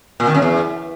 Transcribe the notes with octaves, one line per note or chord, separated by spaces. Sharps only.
A#2
D#3
F#2
E2